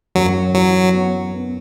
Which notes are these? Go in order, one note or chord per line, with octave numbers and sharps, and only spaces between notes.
F#2 F#3
E3 F#3
B3
B3